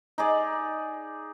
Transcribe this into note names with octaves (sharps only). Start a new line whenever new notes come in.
D#4 G#4 D5